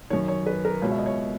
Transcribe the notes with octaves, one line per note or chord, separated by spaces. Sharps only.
F#2 D#3 C#5
C#5
B4
A#4
C#2 B2 C#5
E5
D#5
C#5